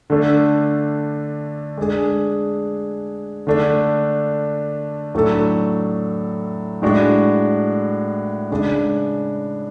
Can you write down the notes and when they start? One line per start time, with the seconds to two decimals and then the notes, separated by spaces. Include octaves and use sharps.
0.10 D3 A3 D4 A4
1.77 G#3 D4 G#4
3.47 D3 A3 D4
5.15 A2 F#3 A3 D4 A4
6.82 A2 G#3 D4 F#4
8.51 C#3 G#3 D4